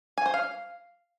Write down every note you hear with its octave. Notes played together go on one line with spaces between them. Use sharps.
G#5
C5
F5